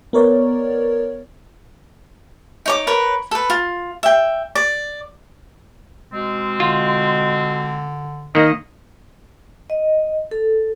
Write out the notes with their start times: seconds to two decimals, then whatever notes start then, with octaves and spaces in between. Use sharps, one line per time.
0.13 B3 A#4 C#5 D5
2.66 D#4 C#5 D6
2.87 A#4 B4 C#5
3.31 A4 B4
3.50 F4
4.03 E5 G5
4.55 D5
6.12 B2 G#3 C4
6.60 D3 F4
8.35 D#3 A#3 D#5
9.70 D#5
10.31 A4